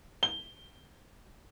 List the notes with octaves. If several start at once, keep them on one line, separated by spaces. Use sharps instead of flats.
G7